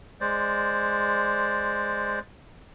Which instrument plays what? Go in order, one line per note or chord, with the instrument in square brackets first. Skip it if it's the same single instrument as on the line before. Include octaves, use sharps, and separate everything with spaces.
[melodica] G#3 C5 D5